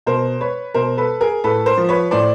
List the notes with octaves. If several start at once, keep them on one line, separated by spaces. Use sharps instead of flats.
B2 A#4 C5
B4 C#5
B2 A#4 C5
A4 B4
G#4 A#4
A2 A4 B4
A#4 C5
F3
B4 C#5
A2 C5 D5